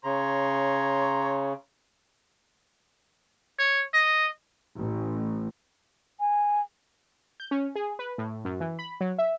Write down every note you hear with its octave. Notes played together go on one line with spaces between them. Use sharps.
C#3 C#5 A#5 C6
C#5
D#5
A1
G#5
G6
C#4
G#4
B4
A2
F#2
E3
B5
F#3
E5